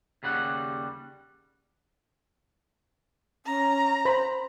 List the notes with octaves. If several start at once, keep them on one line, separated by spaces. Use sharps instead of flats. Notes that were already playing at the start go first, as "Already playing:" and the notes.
D#2 C#3 G3 F#5
C#4 A#5
C5 B5